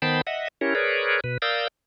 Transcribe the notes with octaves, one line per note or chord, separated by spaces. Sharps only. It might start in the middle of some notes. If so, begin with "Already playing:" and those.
D#3 B3 C5 G5 A5 B5
D#5 E5 F#5
C#4 E4 G4 A#4 C#5
G#4 A#4 B4 C#5 D5
B2 B4
A#4 D5 F5 D#6 E6 G6